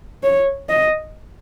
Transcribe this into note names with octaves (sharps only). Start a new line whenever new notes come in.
C#5
D#5